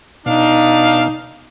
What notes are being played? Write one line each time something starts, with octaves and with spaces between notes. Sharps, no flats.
B2 D4 D#4 F5